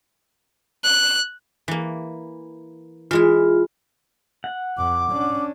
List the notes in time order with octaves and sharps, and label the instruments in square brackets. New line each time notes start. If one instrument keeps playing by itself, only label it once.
[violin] F#6
[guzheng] E3 A#3
[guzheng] E3 G#3 E4 [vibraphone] F4
[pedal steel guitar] F#5
[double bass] F2 [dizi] D6
[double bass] C#4 D4